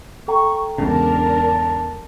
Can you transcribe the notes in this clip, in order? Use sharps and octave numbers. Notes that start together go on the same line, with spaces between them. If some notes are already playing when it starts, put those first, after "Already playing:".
A4 G5 A#5 C#6
E2 G#2 C#3 D4 A#4 A5